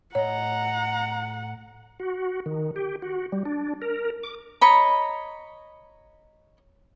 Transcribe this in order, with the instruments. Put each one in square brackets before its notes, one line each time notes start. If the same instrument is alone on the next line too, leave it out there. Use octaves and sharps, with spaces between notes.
[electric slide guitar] A2 D#5 [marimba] C#5 [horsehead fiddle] F#5 [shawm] A#5
[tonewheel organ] F#4
D#3
G4
F#4
G3
D4
A#4
D6
[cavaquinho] C#5 D#5 A#5 B5